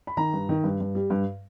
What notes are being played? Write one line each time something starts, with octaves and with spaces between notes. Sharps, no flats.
B5
D#3 A#5
G2
D#3
G2
G2
G3
G2